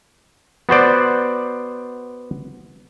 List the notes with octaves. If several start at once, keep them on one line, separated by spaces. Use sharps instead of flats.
B3 F#4 C5 D5